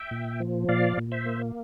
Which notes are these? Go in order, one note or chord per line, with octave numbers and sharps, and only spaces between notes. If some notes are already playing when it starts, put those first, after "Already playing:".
Already playing: E5 G5
A#2
F3
A#2 D5 F5
A#2
C5 E5
A#3